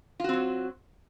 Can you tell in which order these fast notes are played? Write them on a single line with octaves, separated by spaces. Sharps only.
F4 F#4 C4 F#3